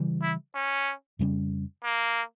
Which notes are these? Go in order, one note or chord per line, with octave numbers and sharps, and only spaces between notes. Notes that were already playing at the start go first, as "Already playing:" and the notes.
Already playing: C#3 E3 G3
E4
C#4
F2 C#3 G3 C#4
A#3